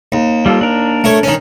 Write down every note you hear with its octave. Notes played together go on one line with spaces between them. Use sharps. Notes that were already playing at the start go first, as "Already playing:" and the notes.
D#2
G3 F4 A4
D4 A#4
A3 C#5
D#3 C#4